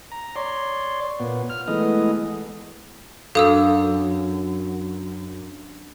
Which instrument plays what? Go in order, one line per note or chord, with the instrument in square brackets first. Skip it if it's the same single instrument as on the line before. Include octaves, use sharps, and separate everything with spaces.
[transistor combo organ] A#5
C#5 D5 C6
A#2 B3
F6
E3 G#3 A3 B3 D#5
[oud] F#2 [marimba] D4 [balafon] A4 [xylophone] F5 D#6 E6